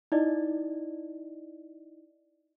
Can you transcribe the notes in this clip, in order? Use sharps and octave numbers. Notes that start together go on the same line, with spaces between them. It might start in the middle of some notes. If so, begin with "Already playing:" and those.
D#4 E4 D5 D#5